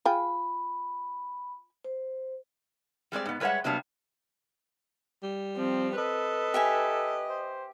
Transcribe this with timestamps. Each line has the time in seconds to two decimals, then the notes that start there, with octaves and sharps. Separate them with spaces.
0.06 F4 G#4 G5 B5
1.85 C5
3.12 G3 G#3 C4 D5
3.26 G#2 B3
3.40 G3 G#3 B4 C#5 E5 F#5
3.64 C3 F#3 G3 A#3 B3 D4
5.23 G3
5.57 F3 C4
5.97 A4 B4 D#5
6.54 G4 E5 G#5
7.30 C5